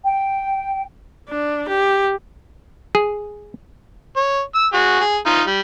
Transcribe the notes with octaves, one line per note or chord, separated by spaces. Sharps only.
G5
D4
G4
G#4
C#5
E6
F#4 G#4
G#4
D#4 F4
G3